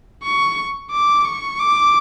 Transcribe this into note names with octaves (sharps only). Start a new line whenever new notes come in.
C#6
D6
C#6
D6